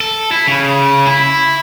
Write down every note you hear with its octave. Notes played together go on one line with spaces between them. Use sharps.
A4
E4
C#3
E4